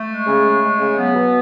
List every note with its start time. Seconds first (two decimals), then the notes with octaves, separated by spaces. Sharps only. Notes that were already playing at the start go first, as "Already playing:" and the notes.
Already playing: A3
0.08 G#3
0.26 C#3
0.44 G#3
0.61 G#3
0.79 C#3
0.97 F#3 B3
1.14 B2